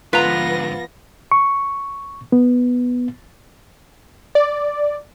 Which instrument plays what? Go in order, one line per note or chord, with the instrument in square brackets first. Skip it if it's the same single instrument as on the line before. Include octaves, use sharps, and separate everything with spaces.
[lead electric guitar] G#2 D3 [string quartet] F3 B3 A#6 [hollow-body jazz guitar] F4 [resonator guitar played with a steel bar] B4 A#5
[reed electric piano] C#6
B3
[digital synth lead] D5